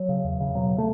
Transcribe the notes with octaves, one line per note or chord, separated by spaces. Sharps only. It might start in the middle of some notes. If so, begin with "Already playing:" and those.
Already playing: F#3
C#3
E2
C#3
B2 F#3
A3